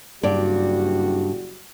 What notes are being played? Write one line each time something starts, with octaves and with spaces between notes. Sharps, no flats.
F#1 G2 G3 F#4 D5